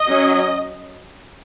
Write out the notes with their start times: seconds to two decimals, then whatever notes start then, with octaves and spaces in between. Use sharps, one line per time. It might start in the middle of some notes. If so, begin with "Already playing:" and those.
Already playing: D#5
0.08 F#3 C#4